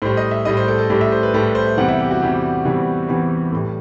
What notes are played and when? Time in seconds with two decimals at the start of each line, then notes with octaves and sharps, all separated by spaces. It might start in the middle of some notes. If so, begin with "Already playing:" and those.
0.02 A2 G3 C5
0.17 D#5
0.31 E5
0.45 A2 G3 D#5
0.57 C5
0.68 A4
0.78 A4
0.90 A2 G3 G4
1.01 E5
1.12 C5
1.23 B4
1.34 A2 G3 A4
1.45 B4
1.55 C5
1.66 E5
1.77 E2 C3 E3 G3 F#5
1.89 E5
1.99 G4
2.11 F#4
2.21 E2 C3 E3 G3 G4
2.65 E2 C3 E3 G3
3.08 E2 C3 E3 G3 B4
3.52 A2 G3